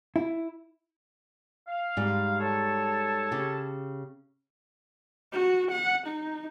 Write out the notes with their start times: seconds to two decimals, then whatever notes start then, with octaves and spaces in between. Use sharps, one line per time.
0.16 E4
1.67 F5
1.97 G#2 G3
2.39 A4 C#5 A5
3.32 C#3 G4
5.32 F#4
5.71 F#5
6.07 D#4